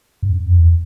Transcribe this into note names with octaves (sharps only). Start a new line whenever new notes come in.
G2
F2
F#2
F2
E2